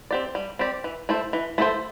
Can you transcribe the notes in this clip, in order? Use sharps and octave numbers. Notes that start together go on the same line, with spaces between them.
C4 G4 D5
G3
C4 G4 D5
E3
A3 E4 A4 C5
E3
A3 E4 A4 C5